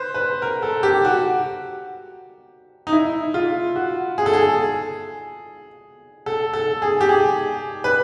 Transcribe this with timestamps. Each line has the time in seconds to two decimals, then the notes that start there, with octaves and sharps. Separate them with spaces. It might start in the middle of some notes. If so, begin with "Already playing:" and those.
Already playing: B4 C5
0.14 B4
0.42 A#4
0.63 A4
0.83 G4
1.05 F#4
2.87 D#4
2.93 E4
3.34 F4
3.76 F#4
4.18 G#4
4.26 A4
4.33 G#4
6.26 A4
6.53 A4
6.82 G#4
7.01 G4
7.09 G#4
7.84 B4